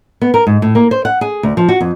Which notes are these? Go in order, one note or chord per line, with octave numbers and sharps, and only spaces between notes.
B3
A#4
G#2
A2
A#3
C5
F#5
G#4
D2
F3
F#4
F2